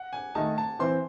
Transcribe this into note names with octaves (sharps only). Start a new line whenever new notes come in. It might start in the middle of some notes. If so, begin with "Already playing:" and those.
Already playing: F#5
G#5
D#3 A3 D#4 A5
A5
E3 C4 E4 C5 C6